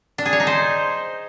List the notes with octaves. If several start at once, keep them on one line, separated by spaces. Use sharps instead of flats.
D4
G#4
C#5
D#4
C5